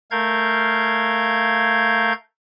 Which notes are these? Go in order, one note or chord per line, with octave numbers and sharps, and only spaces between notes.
A3 A#4 F5 G6 G#6